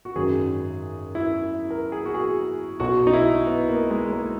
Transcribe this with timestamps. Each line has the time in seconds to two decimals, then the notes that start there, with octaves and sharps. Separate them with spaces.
0.05 F#4
0.16 G#1 F#2 D#3 F#3 G#4
1.15 E4
1.71 A#4
1.92 G#4
2.06 F#4
2.14 G#4
2.80 B1 B2 F#3 F#4
3.07 D#4
3.13 E4
3.47 B3
3.69 A#3
3.91 G#3
4.12 A#3